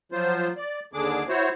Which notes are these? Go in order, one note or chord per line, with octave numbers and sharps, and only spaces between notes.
F3 F#3 F4 C5
D5
D#2 D3 D4 G#4 D6
E4 F#4 C5 C#5